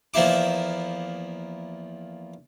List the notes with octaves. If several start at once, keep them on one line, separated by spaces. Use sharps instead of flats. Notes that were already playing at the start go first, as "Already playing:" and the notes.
E2 F3 A#3 E4 D6